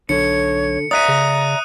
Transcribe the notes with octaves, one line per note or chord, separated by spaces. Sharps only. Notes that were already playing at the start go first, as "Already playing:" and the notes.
B1 D3 C#5 C#7
D5 E5 A#5 D#6 F#6 D#7
C#3